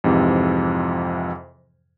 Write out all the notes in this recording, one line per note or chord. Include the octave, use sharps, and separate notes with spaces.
F2 G#2 C3 E3